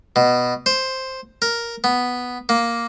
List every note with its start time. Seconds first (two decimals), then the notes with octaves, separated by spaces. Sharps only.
0.16 B2
0.66 C5
1.42 A#4
1.84 B3
2.49 A#3